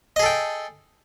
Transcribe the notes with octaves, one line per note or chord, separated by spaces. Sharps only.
G#4 A4 D#5 G5